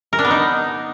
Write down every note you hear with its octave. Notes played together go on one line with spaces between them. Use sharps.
A#4
D4
B3
D#4